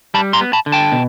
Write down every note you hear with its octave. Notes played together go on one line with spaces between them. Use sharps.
G3 A5 B5
A#5 C6
B3
A5 B5
D3
G5 A5
B2